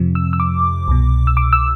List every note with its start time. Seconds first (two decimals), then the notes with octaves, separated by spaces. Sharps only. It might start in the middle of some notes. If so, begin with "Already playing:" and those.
Already playing: F2 C3 F3
0.15 E6
0.33 E6
0.40 D6
0.88 C2 B2
1.27 E6
1.37 D6
1.53 E6